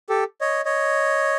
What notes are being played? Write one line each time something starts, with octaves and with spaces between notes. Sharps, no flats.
G4 A4
C#5 D#5
C#5 D#5